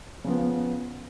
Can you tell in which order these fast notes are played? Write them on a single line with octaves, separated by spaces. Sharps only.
C#3 F3 B3